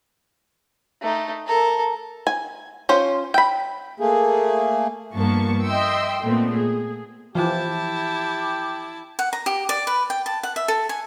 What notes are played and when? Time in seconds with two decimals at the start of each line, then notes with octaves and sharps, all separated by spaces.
1.02 A3 D#4
1.47 A4 A#4
2.27 G#5
2.89 C#4 F4 C5
3.34 G5 B5
4.00 A3 A#3 G#4
5.13 G2 F3 A#3 B3 A5 C#6
5.66 D#5 E5 G5 C6 E6
6.22 A#2 A3 B3 C4
6.52 G#4
7.35 E3 F3 E4 G4 A5
9.19 F#5
9.33 A#5
9.46 G4
9.69 D5
9.87 B4
10.10 G5
10.26 A5
10.43 F#5
10.56 E5
10.68 A4
10.89 G#5